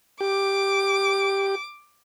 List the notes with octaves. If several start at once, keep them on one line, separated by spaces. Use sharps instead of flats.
G4 D6